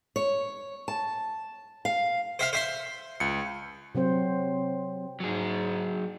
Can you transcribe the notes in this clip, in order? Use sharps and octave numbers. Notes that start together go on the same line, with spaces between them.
C#5
A5
F5
C5 E5 F5
C5 E5 C6
C#2 C#7
C3 F#3 C4 C5
G#2 F#3 G#4